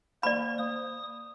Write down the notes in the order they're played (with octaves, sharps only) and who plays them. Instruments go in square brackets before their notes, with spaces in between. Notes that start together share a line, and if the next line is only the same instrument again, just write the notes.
[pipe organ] A#3 C5 [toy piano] D5 B5
[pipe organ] D#6